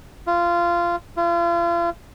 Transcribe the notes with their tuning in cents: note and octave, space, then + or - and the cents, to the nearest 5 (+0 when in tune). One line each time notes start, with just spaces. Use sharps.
F4 -15
F4 -35